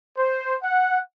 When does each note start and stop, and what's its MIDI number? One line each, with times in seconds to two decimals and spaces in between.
0.17 0.57 72
0.64 0.99 78